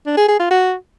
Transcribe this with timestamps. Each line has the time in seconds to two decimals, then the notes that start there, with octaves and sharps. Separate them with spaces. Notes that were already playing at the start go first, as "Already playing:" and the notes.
0.06 D4
0.17 G#4
0.28 G#4
0.39 F4
0.50 F#4